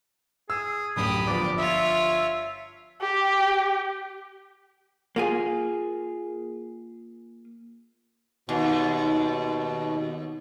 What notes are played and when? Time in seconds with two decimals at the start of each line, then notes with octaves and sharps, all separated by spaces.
0.50 G#4 E6
0.96 D1 F#2 G4 B5 D#6
1.27 G1 F3 D5
1.58 F4 C#5 E5
3.01 G4
5.16 A#3 F4 G#4
8.49 D#2 B2